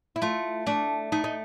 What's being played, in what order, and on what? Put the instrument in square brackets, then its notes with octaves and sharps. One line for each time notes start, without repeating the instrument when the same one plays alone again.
[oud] E4
[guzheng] A3 [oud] F4
[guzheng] A3 [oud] D4
[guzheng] A3 [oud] D#4
[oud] D#4